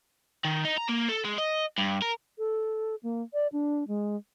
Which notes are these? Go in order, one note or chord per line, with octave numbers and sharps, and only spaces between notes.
D#3
D#4
A#5
A#3
A4
G#3
D#5
G2
A#4
A4
A#3
D5
D4
G#3